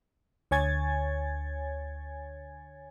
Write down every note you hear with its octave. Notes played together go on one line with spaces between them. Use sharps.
D2 C#5 G#5 G#6 A6